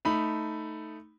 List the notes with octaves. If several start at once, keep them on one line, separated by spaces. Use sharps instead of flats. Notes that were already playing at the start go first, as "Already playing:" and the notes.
A3 D#4 B5